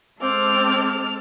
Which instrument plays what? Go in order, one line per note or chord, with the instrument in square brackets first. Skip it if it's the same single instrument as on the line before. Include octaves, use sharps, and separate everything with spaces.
[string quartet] G#3 A4 F6 [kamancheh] C4 D6